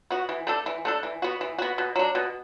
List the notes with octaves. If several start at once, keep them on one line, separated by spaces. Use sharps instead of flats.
B3 F#4
E3
A3 D4 A4
E3
A3 D4 A4
E3
B3 F#4
E3
B3 F#4
B2
F#3 D4
B2